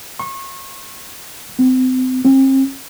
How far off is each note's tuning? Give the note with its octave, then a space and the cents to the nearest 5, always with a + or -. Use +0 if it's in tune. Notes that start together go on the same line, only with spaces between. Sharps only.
C#6 -35
C4 -30
C4 +40